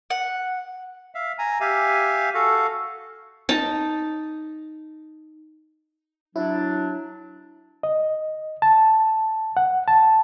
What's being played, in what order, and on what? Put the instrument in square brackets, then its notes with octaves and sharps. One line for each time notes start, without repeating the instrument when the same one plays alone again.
[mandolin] F#5
[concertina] E5 F5
G#5 A#5
G4 E5 F5 G#5
F#4 A4 F5
[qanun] D#4 A5
[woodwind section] F#3 D4 [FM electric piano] E4
[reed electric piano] D#5
A5
F#5
A5